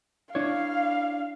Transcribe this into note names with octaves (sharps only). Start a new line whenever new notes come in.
D4 E4 C#5 F5